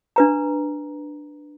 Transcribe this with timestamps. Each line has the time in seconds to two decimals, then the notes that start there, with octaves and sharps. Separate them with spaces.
0.16 D4 B4 A#5